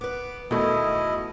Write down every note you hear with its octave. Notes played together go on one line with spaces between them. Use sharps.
B3 B4 D6
E2 B2 D#3 A3 E4 D#5